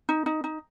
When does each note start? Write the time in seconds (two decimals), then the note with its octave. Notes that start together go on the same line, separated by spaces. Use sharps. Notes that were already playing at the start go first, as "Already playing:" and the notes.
0.09 D#4
0.26 D#4
0.44 D#4